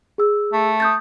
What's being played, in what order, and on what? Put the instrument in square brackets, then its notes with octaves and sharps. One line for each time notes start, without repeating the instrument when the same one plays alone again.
[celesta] G#4 E6
[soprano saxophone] A3
[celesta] D#6 G6 A6